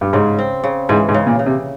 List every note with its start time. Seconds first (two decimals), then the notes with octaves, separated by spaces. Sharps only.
0.01 G2
0.13 G#2 C#3
0.39 C4
0.64 C#3
0.89 G#2 E3
1.09 G#2
1.14 C#3
1.27 A#2
1.39 C#3
1.46 C3